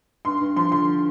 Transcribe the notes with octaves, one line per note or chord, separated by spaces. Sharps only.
G2 C6
G2
F3 C6
D3 C6